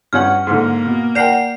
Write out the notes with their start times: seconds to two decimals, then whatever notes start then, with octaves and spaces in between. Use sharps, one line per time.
0.13 G2 C#4 F#5 F6
0.47 G#2 D3 A#3
0.85 B2
1.15 A#4 D5 F#5 G5 C7